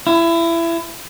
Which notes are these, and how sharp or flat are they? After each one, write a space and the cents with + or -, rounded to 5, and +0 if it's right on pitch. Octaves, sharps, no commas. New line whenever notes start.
E4 +25